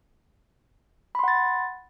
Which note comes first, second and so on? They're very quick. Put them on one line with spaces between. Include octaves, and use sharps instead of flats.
B5 C6 F#5 A6